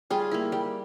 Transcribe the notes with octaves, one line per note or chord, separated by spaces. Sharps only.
G3 F4 G#4
A#3 E4
G3